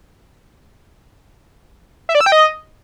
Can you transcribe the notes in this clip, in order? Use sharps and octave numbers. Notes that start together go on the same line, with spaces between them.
E5
D5
E6
G5
D#5